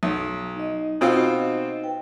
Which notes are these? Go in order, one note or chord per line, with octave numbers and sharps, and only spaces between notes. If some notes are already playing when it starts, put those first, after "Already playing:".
B1
D#4 D#5
B2 C4 F4
B4 G5